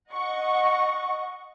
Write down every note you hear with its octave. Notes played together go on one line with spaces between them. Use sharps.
D#5 F#5 C#6